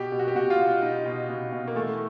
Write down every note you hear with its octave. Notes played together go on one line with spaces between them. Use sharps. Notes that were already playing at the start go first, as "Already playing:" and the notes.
Already playing: B2 G4
B2
F#4
G4
B2 F#4
F4
B2
B2 D#4
B2
B2
B2
A#3
E3 A3